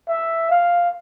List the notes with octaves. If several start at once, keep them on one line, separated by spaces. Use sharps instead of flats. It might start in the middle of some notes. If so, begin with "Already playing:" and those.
E5
F5